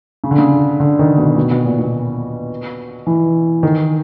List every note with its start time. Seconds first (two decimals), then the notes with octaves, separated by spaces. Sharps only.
0.24 C#3
0.31 D3
0.38 C#3
0.80 D3
0.99 D#3
1.18 B2
1.36 B2
1.51 B2
1.65 A#2
1.79 B2
3.07 E3
3.63 D#3